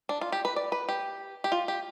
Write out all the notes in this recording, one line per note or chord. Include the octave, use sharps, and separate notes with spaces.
D4
F4
G4
B4
D5
B4
G4
G4
F4
G4